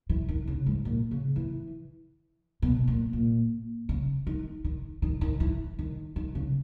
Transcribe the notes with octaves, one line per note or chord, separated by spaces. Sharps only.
E3
D#3
C#3
G#2
A#2
C#3
E3
B2
A#2
A#2
C#3
D#3
D#3
D#3
D#3
E3
D#3
D#3
C#3